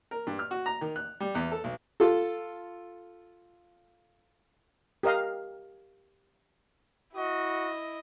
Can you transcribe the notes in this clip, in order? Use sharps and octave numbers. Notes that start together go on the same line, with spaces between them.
A#4
G2
F6
F#4
A#5
D#3
F#6
G3
E2
A4
B1
F4 A4
G4 A#4 D#5 F5
E4 F#4 D#5